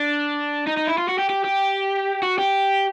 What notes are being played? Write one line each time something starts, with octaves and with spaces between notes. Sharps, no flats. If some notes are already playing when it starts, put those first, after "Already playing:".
Already playing: D4
D#4
D#4
E4
F4
F#4
G4
G4
G4
F#4
G4